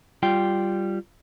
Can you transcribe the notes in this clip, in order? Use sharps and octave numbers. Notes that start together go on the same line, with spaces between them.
G3 F4 G5